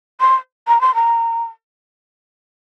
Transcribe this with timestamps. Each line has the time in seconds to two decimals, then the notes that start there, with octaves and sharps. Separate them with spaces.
0.21 C6
0.68 A#5
0.81 C6
0.95 A#5